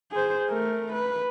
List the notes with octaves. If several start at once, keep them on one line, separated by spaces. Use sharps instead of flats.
G#4 C5
A3 A#4
B4